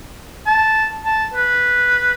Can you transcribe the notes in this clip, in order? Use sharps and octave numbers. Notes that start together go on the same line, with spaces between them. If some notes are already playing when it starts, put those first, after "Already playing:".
A5
A5
B4